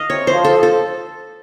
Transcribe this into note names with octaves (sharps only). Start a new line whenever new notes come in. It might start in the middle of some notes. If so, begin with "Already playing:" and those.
Already playing: D#5 F5
C3 C#5
C5
F3
A4
F3
A4